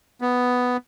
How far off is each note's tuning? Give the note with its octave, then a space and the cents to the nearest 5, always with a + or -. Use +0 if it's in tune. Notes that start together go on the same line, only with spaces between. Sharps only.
B3 +5